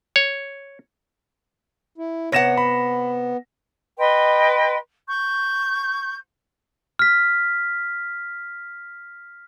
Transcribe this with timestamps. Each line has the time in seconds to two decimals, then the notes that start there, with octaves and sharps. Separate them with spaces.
0.16 C#5
1.98 E4
2.32 C3 B3 C#5 F#5 A#6 E7
2.57 B5
3.98 B4 D#5 G5 C6
5.06 C#6 G6
6.99 F6 B6